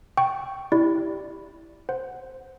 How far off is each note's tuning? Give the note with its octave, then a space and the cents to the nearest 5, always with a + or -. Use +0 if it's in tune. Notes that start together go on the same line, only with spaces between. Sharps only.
G5 -5 C#6 +0
E4 +0 G4 +0 D5 +0
C5 +0 F#5 +0